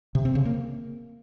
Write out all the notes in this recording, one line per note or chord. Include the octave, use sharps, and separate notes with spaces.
C3
C4
C#3
A#3